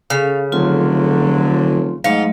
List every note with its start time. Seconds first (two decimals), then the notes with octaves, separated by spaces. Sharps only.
0.10 C#3 C#4 A4 F5
0.52 F1 D3 F#3 F4 C6
2.04 G#2 F#3 A3 F4 D#5